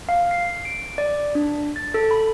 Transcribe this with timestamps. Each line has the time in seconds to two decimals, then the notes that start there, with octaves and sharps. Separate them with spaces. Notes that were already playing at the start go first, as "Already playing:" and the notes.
0.09 F5
0.31 C7
0.65 D7
0.98 D5
1.35 D4
1.76 A6
1.94 A4
2.11 B5